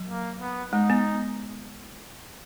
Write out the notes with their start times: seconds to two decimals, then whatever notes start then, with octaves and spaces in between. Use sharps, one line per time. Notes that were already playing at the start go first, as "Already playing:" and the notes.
Already playing: F#3
0.09 A#3
0.41 B3
0.73 G#3 D#4
0.90 B3